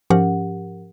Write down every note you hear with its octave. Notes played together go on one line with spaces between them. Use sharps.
G#2 F3 C#4 G4 A#4 F#5